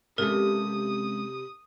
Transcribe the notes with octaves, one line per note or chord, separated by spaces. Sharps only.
C3 G#3 C#4 A4 A#4 E5 D#6